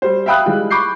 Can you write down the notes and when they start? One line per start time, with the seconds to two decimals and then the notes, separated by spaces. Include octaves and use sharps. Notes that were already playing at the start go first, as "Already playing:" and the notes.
0.02 G3 C5
0.26 E5 F5 G5 B5 D#6 F#6
0.46 E3 G3 G#3 F4
0.71 B5 C#6 D6 G6 C7